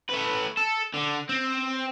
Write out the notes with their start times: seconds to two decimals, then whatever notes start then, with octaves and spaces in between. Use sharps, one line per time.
0.10 A3 B4
0.57 A4
0.94 D3
1.29 C4